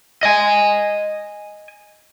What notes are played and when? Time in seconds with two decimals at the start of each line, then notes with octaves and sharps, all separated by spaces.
0.23 D#5 G#5